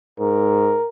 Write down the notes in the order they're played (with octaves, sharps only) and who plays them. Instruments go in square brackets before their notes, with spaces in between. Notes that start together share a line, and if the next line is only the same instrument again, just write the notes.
[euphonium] G#2 [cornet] A#4